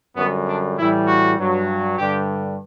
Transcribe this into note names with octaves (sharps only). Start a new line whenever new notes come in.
F#2 D3 G3 B3
D4
A2 E3 G3 E4
F#4
G2 F#3
G2 D3 G3 G4